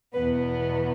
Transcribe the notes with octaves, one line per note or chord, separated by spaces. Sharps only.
E2 B2 B3 B4